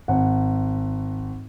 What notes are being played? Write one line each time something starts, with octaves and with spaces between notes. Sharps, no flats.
G#1 F#5